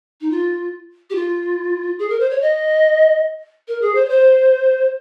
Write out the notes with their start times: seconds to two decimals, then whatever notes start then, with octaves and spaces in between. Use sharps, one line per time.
0.21 D#4
0.31 F4
1.10 G4
1.15 F4
1.99 G#4
2.10 A#4
2.20 C5
2.30 C#5
2.42 D#5
3.68 A#4
3.82 G#4
3.95 C5
4.05 C#5
4.09 C5